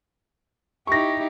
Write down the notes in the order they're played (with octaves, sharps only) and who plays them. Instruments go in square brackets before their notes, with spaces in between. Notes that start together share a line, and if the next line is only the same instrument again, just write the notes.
[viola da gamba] D#4 E4 G4 [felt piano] C#6 A#6